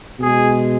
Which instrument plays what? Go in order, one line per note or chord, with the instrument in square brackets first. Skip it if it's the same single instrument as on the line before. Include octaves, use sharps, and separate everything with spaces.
[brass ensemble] B2 G#3 G#4